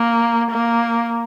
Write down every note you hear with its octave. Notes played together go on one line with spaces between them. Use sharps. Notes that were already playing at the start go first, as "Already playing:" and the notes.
Already playing: A#3
A#3